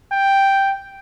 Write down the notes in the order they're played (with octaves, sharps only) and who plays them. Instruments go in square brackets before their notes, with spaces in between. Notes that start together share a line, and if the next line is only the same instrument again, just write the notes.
[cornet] G5